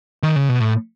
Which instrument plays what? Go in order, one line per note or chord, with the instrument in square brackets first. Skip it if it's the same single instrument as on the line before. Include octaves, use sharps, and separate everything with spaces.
[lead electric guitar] D#3
C#3
B2
A2